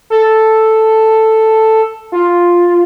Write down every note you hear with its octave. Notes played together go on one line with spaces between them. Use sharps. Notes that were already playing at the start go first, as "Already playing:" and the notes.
A4
F4